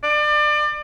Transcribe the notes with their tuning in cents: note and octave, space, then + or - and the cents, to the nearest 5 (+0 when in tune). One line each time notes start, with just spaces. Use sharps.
D5 +30